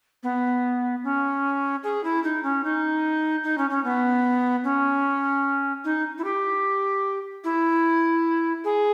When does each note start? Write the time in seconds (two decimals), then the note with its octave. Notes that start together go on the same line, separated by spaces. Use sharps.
0.23 B3
1.04 C#4
1.83 G#4
2.04 E4
2.23 D#4
2.43 C#4
2.64 D#4
3.43 D#4
3.58 C#4
3.70 C#4
3.84 B3
4.64 C#4
5.84 D#4
6.18 E4
6.24 G4
7.44 E4
8.64 G#4